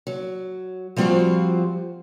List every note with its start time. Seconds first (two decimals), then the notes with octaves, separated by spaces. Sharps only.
0.07 F#3
0.96 F3 G3 C4 F4 F#4 C5